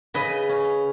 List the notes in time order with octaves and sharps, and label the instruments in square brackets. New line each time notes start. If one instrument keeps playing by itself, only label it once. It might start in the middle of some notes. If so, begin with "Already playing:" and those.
[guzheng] C#3 B4 D#5
C#4